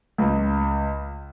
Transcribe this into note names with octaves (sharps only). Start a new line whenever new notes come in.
C#2